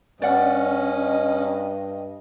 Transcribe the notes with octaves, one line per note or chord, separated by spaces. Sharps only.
G2 C#4 D5 D#5 F#5